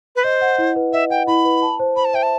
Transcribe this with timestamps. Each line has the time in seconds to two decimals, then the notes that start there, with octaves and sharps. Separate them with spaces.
0.16 B4
0.24 C5 D#5
0.41 F#5
0.58 E4
0.76 B4
0.93 D#5 E5
1.10 F#5 G5
1.27 E4 B5
1.45 B4
1.62 A5
1.79 C5
1.96 C5 B5
2.05 A5
2.14 E5 G5
2.23 A5